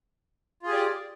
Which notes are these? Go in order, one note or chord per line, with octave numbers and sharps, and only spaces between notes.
F4 G4 G#4 D5